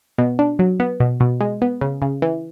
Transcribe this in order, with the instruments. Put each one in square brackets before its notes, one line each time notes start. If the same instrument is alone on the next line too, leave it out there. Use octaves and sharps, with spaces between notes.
[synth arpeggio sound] B2
D4
F#3
B3
B2
B2
G#3
B3
C#3
C#3
E3